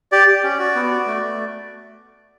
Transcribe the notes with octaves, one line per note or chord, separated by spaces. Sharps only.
G4 D5
G4
C#4
F#4
B3
F#4
A3
A3